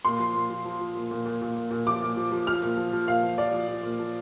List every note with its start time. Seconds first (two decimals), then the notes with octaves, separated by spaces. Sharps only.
0.05 A#2 C6
0.19 F3
0.35 A#2
0.50 F3
0.65 F3
0.80 F3
0.95 A#2
1.11 A#2
1.26 A#2
1.41 A#2
1.56 A#2
1.71 A#2
1.86 F3 D6
2.01 A#2
2.17 F3
2.32 F3
2.47 F3 F6
2.62 A#2
2.77 F3
2.93 F3
3.07 A#2 F5
3.23 F3
3.37 F3 D5
3.54 F3
3.68 F3
3.83 A#2
3.99 F3